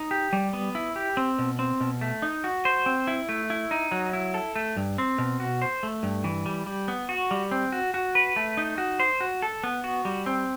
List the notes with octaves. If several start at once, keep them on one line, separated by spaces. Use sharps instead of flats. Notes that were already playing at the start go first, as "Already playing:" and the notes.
Already playing: D#4
G4
G3
B3
E4
G4
C4
B2
C4
B2
A3
D#4
F#4
C5
C4
E4
A3
E4
D#4
F#3
E4
A4
A3
G2
C4
B2
F#4
C5
A3
G2
E3
G3
G3
B3
F#4
G3
C4
F#4
F#4
B4
A3
D#4
F#4
C5
F#4
A4
B3
F#4
G3
C4